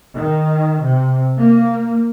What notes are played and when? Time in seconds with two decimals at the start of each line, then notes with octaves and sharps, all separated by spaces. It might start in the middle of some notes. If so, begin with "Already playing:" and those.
0.15 D#3
0.82 C3
1.39 A#3